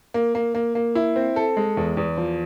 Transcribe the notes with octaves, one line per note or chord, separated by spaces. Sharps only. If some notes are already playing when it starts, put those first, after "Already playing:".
A#3
A#3
A#3
A#3
E4
C4
A4
G#3
E2
E2
F3